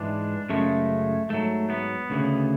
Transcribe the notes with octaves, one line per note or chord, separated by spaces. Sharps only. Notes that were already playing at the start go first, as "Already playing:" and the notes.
Already playing: G#2 E3 G#3 D4
F#2 C#3 G#3 A3
G#2 F#3 A3
B3
D2 C#3 E3